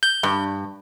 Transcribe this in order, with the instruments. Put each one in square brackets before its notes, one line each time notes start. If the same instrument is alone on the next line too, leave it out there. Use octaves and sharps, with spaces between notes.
[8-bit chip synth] G6
[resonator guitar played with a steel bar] G2